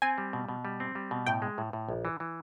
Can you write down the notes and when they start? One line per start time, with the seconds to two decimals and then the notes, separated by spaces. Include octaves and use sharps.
0.02 C4 G#5
0.18 G3
0.33 B2
0.49 B2
0.65 G3
0.80 C4
0.95 G3
1.11 B2
1.26 A2 G5
1.42 G#3
1.58 A2
1.73 A2
1.89 A#1
2.05 E3
2.20 E3